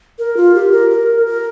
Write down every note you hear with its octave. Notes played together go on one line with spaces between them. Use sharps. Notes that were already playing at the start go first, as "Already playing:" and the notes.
A#4
F4
G4
A#4
A#4
A#4